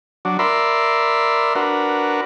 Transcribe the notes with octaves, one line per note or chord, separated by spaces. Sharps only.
F#3 D4
A#4 D5 E5 B5 C6
D4 F#4 A#4 B4